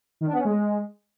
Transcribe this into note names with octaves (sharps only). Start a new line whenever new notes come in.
D#3
D4
B3
C#4
G#3